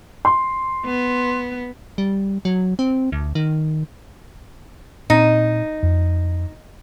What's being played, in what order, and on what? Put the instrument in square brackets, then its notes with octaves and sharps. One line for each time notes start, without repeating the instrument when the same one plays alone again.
[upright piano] C6
[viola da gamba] B3
[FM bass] G3
F#3
C4
D2
D#3
[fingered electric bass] A#2 C4 [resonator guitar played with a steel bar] D#4
[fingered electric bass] F2